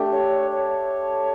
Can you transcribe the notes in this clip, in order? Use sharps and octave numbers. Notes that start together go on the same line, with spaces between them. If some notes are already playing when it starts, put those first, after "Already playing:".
Already playing: A3 D4 G4
C#5
C#5